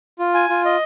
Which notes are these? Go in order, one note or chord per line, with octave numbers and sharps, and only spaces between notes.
F4
G#5
F4
D#5